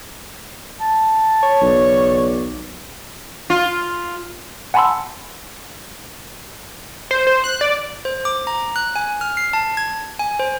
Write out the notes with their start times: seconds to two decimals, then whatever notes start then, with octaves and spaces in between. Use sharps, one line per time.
0.80 A5
1.43 C#5
1.61 B1 C#3 D5
3.50 F4
4.74 F#5 G#5 A5 B5 C6 E6
7.11 C5
7.27 C5
7.44 F#6
7.61 D5
8.05 C5
8.25 D6
8.47 A#5
8.76 F#6
8.96 G#5
9.21 F6
9.37 C7
9.53 A5
9.77 G#6
10.19 G#5
10.39 C5